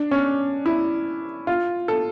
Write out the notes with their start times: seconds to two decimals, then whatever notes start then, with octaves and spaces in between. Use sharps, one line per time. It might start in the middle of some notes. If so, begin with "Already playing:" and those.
Already playing: D4
0.11 C#4
0.66 E4
1.47 F4
1.88 A4